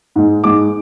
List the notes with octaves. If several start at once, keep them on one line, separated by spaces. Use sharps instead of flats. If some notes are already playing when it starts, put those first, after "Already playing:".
G#2 G#3
G#2 G#3 D6